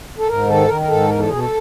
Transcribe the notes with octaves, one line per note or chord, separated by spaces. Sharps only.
A4
G#2 A#4
D#3 A4
D#3 A#4
A#4
G#2 A4
E2 A#4
A4
B2 G#4
A4